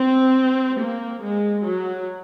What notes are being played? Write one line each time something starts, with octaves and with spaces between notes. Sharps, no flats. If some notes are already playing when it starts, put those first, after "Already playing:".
Already playing: C4
A#3
G#3
F#3